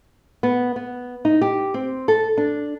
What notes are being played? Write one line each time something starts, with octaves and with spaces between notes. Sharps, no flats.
B3
B3
D#4
G4
C4
A4
D4